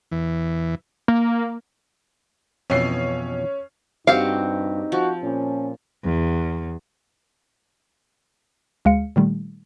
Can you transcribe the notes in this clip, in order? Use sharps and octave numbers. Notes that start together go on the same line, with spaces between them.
E2 E3
A#3
F2 B2 E3 C#4 C7
G2 C4 D#4 F#4 G4 F5
F3 F#4
A#2 C#4
E2
D2 G#3 F5 C#7
A#2 D#3 G3 A3